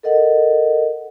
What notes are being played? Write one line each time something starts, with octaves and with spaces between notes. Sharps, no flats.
A4 A#4 D#5 F#5